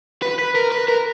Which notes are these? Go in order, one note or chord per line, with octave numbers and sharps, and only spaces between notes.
B4
B4
A#4
B4
A#4